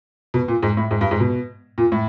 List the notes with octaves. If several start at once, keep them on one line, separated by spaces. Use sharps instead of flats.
B2
A#2
G#2
A2
G#2
G2
G#2
B2
A#2
A2